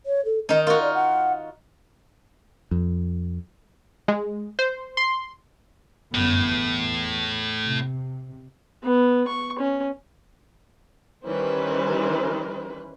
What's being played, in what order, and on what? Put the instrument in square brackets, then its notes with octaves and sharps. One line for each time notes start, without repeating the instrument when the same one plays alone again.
[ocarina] C#5
A4
[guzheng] D#3 D#4 [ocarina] D#5
[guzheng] F4 F#4 [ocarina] A#4
[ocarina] D5
F#5
[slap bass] F2
[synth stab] G#3
C5
C6
[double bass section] G1 F#2 B3 [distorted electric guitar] A2
[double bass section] E2
C3
[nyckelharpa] B3
C#6
C#4
[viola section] D#3 E3 G3 C#4 B4 C5